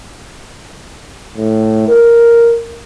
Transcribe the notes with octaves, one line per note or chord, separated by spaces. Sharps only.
A2
A#4